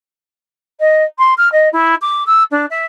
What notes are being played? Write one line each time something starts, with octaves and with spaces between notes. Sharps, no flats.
D#5
C6
F6
D#5
E4
D6
E6
D4
E5